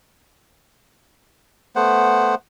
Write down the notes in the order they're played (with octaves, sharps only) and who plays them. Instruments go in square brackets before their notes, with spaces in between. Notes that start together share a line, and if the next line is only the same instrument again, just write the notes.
[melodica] A3 B3 C5 F#5